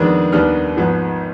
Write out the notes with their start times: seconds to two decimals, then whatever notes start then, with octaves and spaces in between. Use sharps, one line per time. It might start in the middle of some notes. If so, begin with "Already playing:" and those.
Already playing: F2 D#3 G#3 B3 D4
0.32 D#2 D#3 G3 B3 D4 F6
0.77 G#1 G#2 F3 B3